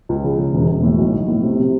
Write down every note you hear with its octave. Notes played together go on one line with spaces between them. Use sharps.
C#2
C#3
C#3
E1
E1
A2
B1
B1
A2
C3
C3